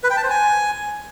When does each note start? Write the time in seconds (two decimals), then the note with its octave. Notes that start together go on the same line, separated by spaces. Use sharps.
0.04 B4
0.10 G5
0.17 A5
0.23 C5
0.30 G#5